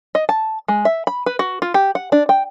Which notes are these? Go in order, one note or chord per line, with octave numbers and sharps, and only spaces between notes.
D#5
A5
G#3
E5
B5
B4
F#4
F4
G4
F#5
D4
G5